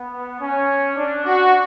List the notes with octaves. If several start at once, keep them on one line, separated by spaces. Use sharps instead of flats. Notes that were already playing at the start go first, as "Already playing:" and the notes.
Already playing: B3
C#4
D4
F#4